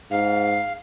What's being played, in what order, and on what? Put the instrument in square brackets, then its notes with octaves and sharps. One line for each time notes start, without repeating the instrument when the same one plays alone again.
[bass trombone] G#2 [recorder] F5